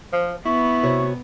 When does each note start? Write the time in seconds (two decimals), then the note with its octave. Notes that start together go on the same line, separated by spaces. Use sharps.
0.13 F3 C5
0.45 B3 E4 C#6
0.83 C3 F#4 C#5